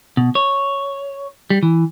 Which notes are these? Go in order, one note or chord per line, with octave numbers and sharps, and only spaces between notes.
B2
C#5
G3
E3